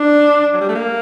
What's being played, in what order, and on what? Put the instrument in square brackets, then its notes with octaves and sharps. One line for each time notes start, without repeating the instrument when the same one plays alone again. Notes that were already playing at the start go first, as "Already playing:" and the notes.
Already playing: [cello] D4
[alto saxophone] F#3
G3
A3
A#3